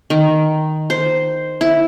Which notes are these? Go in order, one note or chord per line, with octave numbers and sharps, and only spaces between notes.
D#3
C5
E4